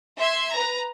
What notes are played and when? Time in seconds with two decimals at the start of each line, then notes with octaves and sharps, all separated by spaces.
0.19 E5 C6 G#6
0.53 B4 A#5